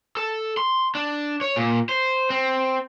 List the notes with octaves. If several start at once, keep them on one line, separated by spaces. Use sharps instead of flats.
A4
C6
D4
C#5
A#2
C5
C4